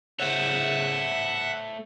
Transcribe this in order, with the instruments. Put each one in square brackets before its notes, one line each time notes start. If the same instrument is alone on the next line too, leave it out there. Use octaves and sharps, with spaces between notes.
[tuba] C#3 [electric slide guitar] A3 C5 C#5 [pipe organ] E5 F#5